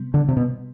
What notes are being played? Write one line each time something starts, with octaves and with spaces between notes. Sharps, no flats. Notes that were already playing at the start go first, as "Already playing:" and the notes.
Already playing: C3 G3 B3
D3
C3
B2